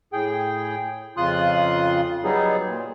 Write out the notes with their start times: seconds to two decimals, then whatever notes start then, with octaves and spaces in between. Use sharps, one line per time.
0.13 A2 G#4 G5
1.17 F2 C#3 F4 C6 D#6 F#6
2.24 F#3 G3 B3 D#4 G#4
2.67 A#2